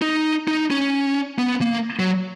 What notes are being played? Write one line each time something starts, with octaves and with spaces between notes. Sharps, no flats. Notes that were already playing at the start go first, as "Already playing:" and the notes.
D#4
D#4
C#4
B3
A#3
F#3